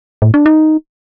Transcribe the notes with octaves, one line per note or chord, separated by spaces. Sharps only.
A2
D4
D#4